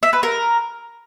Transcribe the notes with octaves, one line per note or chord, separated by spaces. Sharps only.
E5
B4
A#4